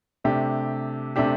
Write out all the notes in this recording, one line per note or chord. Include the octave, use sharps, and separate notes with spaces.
C3 A3 D4 G4
C3 A3 D4 G4